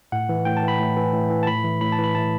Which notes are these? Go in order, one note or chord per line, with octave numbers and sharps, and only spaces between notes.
A2 F#5
E3
A2 G5
A5
E3
B5
A2
E3
A2
E3
A5
A2 B5
E3
A2 B5
A5
E3
B5
A2 A5